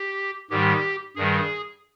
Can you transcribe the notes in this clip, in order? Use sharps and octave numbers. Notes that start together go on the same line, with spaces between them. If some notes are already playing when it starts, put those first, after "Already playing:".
Already playing: G4
G#2 D#3 G3 G4
G2 D#3 G3 G#4